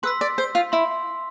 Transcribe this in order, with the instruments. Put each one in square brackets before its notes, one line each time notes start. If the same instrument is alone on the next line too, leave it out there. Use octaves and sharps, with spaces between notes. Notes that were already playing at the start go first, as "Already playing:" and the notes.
[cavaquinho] B4 [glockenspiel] C6 E6 B6
[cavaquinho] D5
C5
F4
[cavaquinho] E4 [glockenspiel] C6